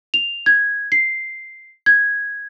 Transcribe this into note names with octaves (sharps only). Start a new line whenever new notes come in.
F7
G#6
C7
G#6